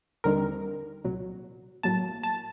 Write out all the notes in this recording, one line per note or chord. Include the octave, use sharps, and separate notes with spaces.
D#2 D3 G3 C4 D#4 A#4
C2 A#2 F#3
A2 F#3 A#3 A5
A5